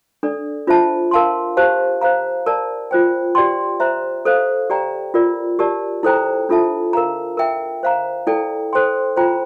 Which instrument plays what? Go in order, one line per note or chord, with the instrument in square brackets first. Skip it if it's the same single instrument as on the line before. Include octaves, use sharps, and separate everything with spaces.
[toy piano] D4 A4 D5
D4 F4 C5 E5 A5
A#4 F5 A5 C6
G4 C5 F5 A5
C5 F5 A#5
A#4 D5 A5
F4 C5 G5
G4 D5 G5 C6
C5 E5 A#5
A4 C5 F5
G4 D5 G5 A#5
F4 A#4 D5
G4 A#4 D5 A5
E4 A4 C5 G5 A#5
D4 F4 A4 E5 A5
A#4 F5 A#5
A#4 E5 G5
C5 F5 A#5
E4 A4 D5 G5
A4 C5 G5 C6
F4 C5 G5 A#5